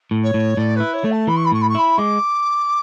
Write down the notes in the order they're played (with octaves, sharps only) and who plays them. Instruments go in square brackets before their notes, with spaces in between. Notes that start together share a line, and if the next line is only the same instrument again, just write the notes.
[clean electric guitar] A2
[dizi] C#5
[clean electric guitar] A2
[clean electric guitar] A2 [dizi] D5
[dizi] B4
[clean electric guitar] E4
[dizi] C#5
[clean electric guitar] A3
[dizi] A5
[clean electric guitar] E3 [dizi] B5
[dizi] C#6
B5
[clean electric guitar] A2 [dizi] C#6
[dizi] B5
C#6
[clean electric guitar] E4 [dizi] B5
[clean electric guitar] G#3 [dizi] D6